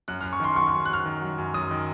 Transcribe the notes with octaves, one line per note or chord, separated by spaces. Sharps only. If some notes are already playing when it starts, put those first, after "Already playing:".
F#2 F#6
F#2 F6
C#6
D#3 C6
F#3 C#6
F#2 C#6
F#6
F#2 F6
D#3
F#3
F#2
F#2 D#6
D#3